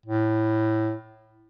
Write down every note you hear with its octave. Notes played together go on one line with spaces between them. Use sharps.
A2